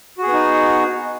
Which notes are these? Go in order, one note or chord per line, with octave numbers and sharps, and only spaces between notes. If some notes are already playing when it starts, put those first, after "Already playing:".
B3 D#4 F#4 G#4